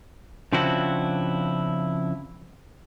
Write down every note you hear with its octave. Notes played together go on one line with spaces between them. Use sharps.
C#3 F3 C4 D4 E4 F#4